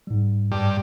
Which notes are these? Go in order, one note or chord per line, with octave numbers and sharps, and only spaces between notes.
G#2 G3
G2